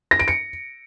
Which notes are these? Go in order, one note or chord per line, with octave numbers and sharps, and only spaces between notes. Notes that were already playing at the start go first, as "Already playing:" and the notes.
A#6
D7
C#7